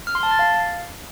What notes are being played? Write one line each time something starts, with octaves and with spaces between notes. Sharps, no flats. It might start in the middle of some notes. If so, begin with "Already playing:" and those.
F6
C6
A5
A6
F5